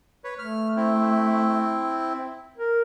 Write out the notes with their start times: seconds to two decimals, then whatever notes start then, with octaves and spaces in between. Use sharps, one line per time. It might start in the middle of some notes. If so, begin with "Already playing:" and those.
0.24 B4 C#5
0.39 A3 F6
0.76 C4 E4
2.58 A#4